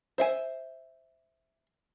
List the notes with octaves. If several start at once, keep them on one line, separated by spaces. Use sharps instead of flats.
C5 E5 G#5